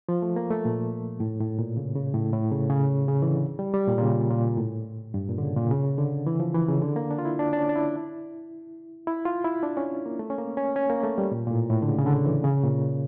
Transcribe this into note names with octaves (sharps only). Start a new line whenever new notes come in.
F3
A3
A#3
A3
A#2
A2
A2
A#2
C#3
C#3
A2
A2
C#3
C#3
C#3
E3
D3
G3
G3
A#2
A#2
C#3
A#2
A2
G2
A#2
D3
C#3
A#2
C#3
D3
E3
F3
E3
C#3
D3
A#3
D4
F4
E4
D4
D4
C#4
D4
E4
E4
F4
E4
D4
C#4
A#3
A3
C#4
A#3
C#4
C#4
A#3
A3
G3
A#2
A#2
A2
A2
D3
C#3
C#3
D3
E3
C#3
A#2